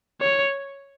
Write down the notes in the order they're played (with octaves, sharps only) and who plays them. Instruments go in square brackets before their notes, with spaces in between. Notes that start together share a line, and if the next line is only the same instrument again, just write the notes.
[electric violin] C#5